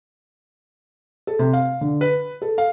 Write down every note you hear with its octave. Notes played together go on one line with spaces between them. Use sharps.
A4
C3
F5
D3
B4
A4
F5